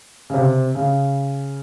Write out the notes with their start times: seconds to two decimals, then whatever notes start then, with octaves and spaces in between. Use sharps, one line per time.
0.30 C#3
0.34 C3
0.75 C#3